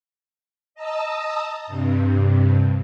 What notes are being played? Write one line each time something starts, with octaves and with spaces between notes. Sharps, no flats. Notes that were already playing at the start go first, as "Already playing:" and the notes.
D#5 A5 A#5 D#6 E6
G2 C3